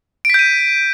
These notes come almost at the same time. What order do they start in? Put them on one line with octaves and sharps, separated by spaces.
D7 B6 G6 D#7